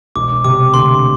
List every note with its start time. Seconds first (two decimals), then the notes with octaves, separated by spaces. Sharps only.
0.16 E1 D6
0.44 C3 D6
0.73 D2 C6